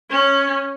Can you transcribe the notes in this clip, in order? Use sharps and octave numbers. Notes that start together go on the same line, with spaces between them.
C#4